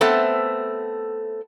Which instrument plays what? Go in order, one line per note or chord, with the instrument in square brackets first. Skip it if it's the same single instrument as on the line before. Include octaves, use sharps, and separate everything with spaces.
[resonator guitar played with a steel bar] A3 B3 C4 A4 E5